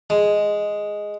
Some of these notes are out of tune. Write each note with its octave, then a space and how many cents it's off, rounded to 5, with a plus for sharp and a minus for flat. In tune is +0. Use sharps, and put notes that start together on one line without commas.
G#3 +0